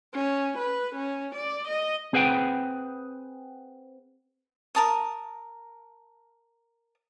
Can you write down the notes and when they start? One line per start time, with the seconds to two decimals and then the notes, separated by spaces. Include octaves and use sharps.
0.13 C#4
0.58 B4
0.95 C#4
1.35 D5
1.68 D#5
2.13 C4 G#4 B4 F#5 G5
4.75 A#4 A5 D#6